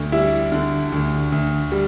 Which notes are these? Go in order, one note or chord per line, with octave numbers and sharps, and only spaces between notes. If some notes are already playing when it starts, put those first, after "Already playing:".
Already playing: D2
G3 E4
D3
D2
D2
G3